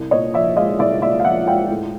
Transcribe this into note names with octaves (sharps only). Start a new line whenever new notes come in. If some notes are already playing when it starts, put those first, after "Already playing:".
Already playing: C2
A#2 C#5 D#5
F3 D5 E5
G#3 D#5 F5
C2 D5 E5
A#2 D5 E5
F5
F3 E5 F#5
G#3 F5 G5
A2